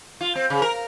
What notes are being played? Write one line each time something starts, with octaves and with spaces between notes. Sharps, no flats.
F4
C4
C#3
A#4